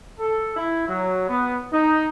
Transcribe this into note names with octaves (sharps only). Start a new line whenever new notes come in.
A4
E4
F#3
B3
D#4